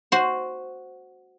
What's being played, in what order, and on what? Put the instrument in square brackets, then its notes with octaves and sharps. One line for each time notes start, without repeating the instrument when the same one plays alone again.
[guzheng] F#4 C5